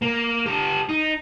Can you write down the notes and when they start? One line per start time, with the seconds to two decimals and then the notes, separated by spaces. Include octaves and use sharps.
0.02 A#3
0.46 G4 A4
0.89 D#4